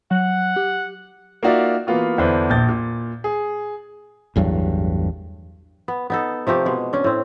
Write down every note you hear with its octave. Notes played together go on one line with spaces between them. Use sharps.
F#3 F#5
G4
A#3 D#4 F4 F#4 D5 E5
E3 A#3 B3 F4 F#4
E2 D3 D4 E4 B4 C5
A#1 A#2 G6 A6
A#2
G#4
A1 E2 G2 F#3
B3
B3 D#4 A4
C3 F3 A3 G4
B2 G#3
C#4 D4
A2 C4